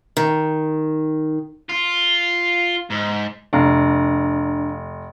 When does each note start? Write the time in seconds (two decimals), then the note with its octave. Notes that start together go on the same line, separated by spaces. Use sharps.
0.17 D#3
1.69 F4
2.91 G#2
3.53 F1 D4 F5 A#5